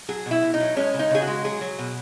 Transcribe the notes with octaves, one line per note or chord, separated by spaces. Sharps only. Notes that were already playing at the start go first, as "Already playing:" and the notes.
F#3 G#4
B2
E4
B2
D#4
F#3
G#3 C#4
C#3
D#4
C#3 G#4
F#4
G#3
F#3 G#4
F#3
B2